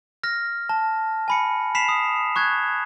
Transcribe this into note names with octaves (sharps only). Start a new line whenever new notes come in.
F6 A#6
A5
G#5 B5 C#7
B5 B6 C7 E7 F7
D#6
C#6 F#6 G#6